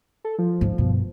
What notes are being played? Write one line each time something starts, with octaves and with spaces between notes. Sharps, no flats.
A4
F3
G#2
G2 B2